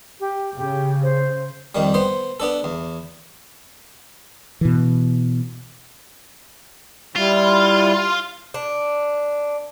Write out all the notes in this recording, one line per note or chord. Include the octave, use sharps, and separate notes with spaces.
G4
C#3 G4
C5
F2 D#3 G3
B3 C5
B3 D4 A4
E2
B2 E3
G3 E4 F4
D4